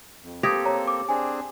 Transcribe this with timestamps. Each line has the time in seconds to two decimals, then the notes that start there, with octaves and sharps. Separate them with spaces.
0.23 F2
0.43 A#3 C4 G4 A4 D#6 G#6 A#6
0.65 C#5 A#5
0.87 D6
1.09 C4 D4 G#4 G#5